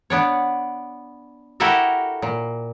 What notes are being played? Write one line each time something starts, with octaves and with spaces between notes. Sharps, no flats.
B3 D4 C#5
E4 F#4 G4 A4 A#4 E5
A#2